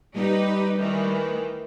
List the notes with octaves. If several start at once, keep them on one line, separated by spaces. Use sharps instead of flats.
G3 D#4 G4 B4
D#3 E3 A3